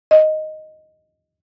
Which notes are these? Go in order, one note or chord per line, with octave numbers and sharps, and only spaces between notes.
D#5